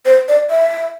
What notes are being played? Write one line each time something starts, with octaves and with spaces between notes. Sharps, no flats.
C5
D5
E5